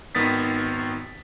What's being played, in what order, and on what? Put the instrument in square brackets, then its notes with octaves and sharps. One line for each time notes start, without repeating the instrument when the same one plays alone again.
[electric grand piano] G#1 D#3 B3 D#6 A6 B6